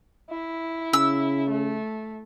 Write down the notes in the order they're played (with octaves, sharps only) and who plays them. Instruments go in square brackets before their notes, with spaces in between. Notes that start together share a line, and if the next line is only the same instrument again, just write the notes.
[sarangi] E4
[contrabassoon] C#3 [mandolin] E6
[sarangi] A3